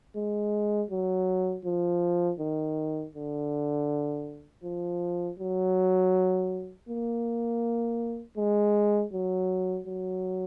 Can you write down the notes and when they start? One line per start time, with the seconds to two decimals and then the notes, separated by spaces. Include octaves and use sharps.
0.16 G#3
0.91 F#3
1.65 F3
2.39 D#3
3.15 D3
4.64 F3
5.39 F#3
6.89 A#3
8.37 G#3
9.13 F#3
9.87 F#3